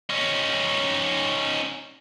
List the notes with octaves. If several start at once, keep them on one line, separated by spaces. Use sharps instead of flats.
C#4 D#4